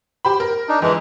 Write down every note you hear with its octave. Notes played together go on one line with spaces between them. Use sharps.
G4 C5 B5
A#4
D4 D#4
F2 E3 G#3